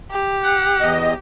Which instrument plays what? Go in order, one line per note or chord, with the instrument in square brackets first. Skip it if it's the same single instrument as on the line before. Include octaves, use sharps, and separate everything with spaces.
[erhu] G4
[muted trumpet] F#5
[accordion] E2 D#5